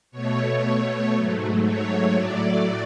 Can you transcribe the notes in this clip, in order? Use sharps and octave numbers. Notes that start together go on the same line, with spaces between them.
B2 A3 C#5
G#2 F#3 A3
C#5
A2 F#3 A3 D5